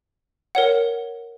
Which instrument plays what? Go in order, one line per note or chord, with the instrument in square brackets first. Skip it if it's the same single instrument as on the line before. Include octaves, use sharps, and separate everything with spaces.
[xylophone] A#4 C#5 F#5